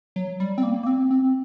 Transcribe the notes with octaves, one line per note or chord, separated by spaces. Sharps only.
F#3
G3
C4
A#3
A#3
C4
C4